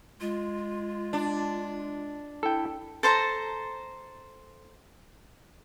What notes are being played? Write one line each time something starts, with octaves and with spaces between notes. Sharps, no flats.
G#3 F4
D4
E4 A4 G5
A4 C5 A5 A#5